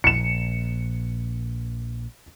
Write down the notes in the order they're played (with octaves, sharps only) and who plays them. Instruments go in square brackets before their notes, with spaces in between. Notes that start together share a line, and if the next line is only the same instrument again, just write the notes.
[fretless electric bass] A#1 [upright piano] C#7 E7